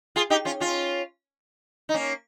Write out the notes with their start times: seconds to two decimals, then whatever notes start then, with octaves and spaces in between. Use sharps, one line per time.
0.16 F4 G#4
0.30 D#4 G4
0.45 C#4 F4
0.60 C#4 F4
1.89 D#4
1.94 A#3 C#4